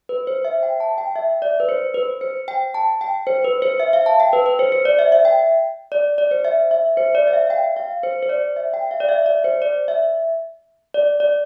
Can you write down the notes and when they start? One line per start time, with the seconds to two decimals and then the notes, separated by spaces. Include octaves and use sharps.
0.09 B4
0.27 C5
0.45 E5
0.63 G5
0.80 A5
0.98 G5
1.16 E5
1.42 D5
1.60 B4
1.69 C5
1.94 B4
2.21 C5
2.48 G5
2.74 A5
3.01 G5
3.27 C5
3.44 B4
3.62 C5
3.80 E5
3.93 F5
4.06 A5
4.20 G5
4.33 B4
4.46 B4
4.59 C5
4.72 C5
4.85 D5
4.99 E5
5.12 E5
5.25 G5
5.92 D5
6.18 D5
6.31 C5
6.45 E5
6.71 E5
6.97 C5
7.15 D5
7.27 E5
7.33 F5
7.50 G5
7.76 F5
8.03 C5
8.23 C5
8.29 D5
8.56 E5
8.74 G5
8.91 F5
9.00 D5
9.09 E5
9.26 D5
9.44 C5
9.62 D5
9.88 E5
10.94 D5
11.20 D5